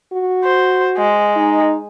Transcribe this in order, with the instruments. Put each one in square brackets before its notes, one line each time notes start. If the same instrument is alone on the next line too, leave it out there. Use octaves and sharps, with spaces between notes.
[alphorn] F#4
[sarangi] C5
G#3
[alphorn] D#4